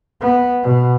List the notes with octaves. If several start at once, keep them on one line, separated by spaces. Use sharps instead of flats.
B3
B2